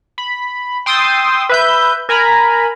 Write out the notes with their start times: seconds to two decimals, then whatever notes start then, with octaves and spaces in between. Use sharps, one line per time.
0.18 B5
0.86 G5 C6 D#6 E6 A6
1.49 B4 E5 G6
2.09 A#4 G#5 A#5 B5